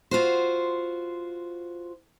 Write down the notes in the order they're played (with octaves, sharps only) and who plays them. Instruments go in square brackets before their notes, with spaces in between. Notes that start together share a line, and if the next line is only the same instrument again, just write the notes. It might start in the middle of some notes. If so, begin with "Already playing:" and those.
[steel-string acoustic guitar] F4 F#4 C5